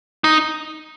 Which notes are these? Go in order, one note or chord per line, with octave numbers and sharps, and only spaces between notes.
D#4